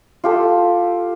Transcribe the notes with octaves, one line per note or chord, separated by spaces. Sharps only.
F4 G4 A4